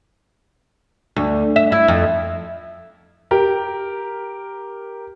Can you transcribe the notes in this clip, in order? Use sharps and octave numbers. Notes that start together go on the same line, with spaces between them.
D2
E5
E4
F2
G4 A#4